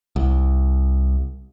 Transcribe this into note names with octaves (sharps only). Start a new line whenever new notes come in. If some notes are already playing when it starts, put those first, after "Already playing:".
C2